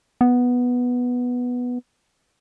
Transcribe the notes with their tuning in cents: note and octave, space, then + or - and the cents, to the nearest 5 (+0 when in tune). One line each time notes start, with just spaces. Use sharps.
B3 -5